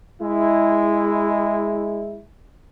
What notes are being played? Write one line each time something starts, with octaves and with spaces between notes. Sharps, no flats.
G#3 E4